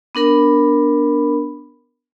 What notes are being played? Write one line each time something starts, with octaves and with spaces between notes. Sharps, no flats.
B3 D4 A#4 B5